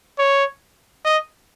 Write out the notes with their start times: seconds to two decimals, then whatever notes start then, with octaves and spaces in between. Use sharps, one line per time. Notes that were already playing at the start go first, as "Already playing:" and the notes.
0.19 C#5
1.05 D#5